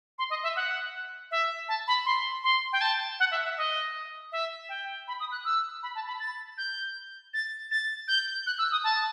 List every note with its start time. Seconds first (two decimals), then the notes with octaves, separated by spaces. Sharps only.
0.19 C6
0.30 D#5
0.43 E5
0.56 F#5
1.31 E5
1.68 A5
1.88 B5
2.06 C6
2.44 C6
2.73 G5
2.81 A5
3.20 F#5
3.31 E5
3.44 E5
3.57 D#5
4.32 E5
4.69 G5
5.08 B5
5.20 D#6
5.32 F#6
5.45 E6
5.83 B5
5.95 A5
6.08 B5
6.20 A6
6.58 G6
7.34 A6
7.71 A6
8.08 G6
8.47 F#6
8.59 E6
8.72 D#6
8.84 A5